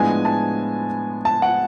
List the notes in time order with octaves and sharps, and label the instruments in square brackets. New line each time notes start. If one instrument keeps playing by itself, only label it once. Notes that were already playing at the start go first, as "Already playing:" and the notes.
Already playing: [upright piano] A2 F3 G#3 B3 D4 G#5
A5
A5
F#5